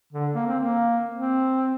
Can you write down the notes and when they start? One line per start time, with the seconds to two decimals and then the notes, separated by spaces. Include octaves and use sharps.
0.13 D3
0.34 A#3
0.47 C4
0.60 A#3
1.14 C4